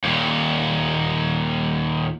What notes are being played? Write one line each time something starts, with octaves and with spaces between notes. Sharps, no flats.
D#2 A#2